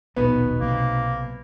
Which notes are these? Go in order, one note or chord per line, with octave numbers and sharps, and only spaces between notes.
D#1 A#1 B2 B3 D#4
B1 C3 A#3